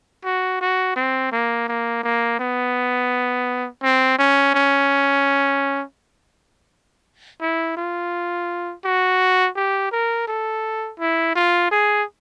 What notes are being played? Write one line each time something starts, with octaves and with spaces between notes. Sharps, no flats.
F#4
F#4
C4
A#3
A#3
A#3
B3
C4
C#4
C#4
E4
F4
F#4
G4
A#4
A4
E4
F4
G#4